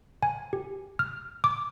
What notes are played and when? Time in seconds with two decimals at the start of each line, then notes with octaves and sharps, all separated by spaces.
0.23 G#5
0.53 G4
0.99 F6
1.44 D6